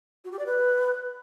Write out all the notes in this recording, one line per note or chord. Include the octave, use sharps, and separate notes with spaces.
F#4
G4
D5
B4